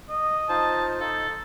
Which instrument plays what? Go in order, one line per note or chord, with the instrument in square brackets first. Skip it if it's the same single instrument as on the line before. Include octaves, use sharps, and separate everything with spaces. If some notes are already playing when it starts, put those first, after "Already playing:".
[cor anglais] D#5
[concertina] D#4 F4 C5 [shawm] A5
[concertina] D#4 [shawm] A4